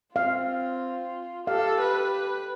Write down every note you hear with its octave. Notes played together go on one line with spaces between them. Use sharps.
C4 F4 F5
G4 A4 F5
B4